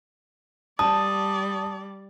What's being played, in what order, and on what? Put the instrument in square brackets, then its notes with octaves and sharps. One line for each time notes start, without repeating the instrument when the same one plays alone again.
[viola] G3 D5 [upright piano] A5 [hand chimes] D#6